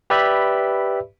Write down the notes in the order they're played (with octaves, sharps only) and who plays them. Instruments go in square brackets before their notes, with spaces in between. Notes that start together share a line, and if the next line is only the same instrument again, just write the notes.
[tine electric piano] G4 B4 D5 E5 B5